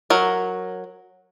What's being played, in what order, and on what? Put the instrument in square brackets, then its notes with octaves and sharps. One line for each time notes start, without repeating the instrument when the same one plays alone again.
[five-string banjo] F#3 A#4